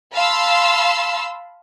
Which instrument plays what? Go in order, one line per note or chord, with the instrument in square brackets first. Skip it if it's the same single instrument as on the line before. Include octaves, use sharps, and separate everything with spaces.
[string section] F5 A5 B5 C6 E6